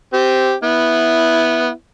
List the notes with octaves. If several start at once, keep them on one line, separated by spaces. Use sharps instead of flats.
C4 G4
B3 E4